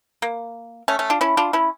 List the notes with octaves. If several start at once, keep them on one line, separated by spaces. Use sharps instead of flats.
A#3
A3 C#4
A3 C#4
D4 F4
C#4 E4
D4 F4
C#4 E4